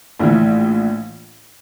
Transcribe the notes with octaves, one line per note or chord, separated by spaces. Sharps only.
A#1 A2 E3